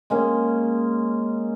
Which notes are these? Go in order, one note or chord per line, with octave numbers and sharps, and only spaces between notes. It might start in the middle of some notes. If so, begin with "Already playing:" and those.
G#3 A#3 C#4